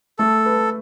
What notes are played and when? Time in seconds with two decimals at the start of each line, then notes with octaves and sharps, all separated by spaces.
0.18 A3 A4
0.46 B4